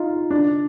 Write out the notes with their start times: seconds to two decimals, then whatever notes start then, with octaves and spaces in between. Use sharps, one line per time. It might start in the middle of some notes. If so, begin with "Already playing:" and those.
Already playing: D#4 F4
0.30 D4